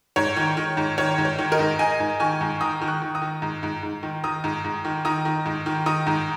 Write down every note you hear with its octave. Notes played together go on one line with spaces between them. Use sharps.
G#2 C#5
D#3
D#3
G#2
D#3 C#5
G#2
C#5
D#3
A#4 D#5
G#2
G#2 D#5 G#5
G#2
D#3 G#5 C#6
G#2
D#3 A#5 D#6
D#3
C#6 F#6
D#3
A#5 D#6
D#3
G#2
G#2
G#2
D#3
D#3 A#5 D#6
G#2
G#2
D#3
D#3 A#5 D#6
D#3
G#2
D#3
D#3 A#5 D#6
G#2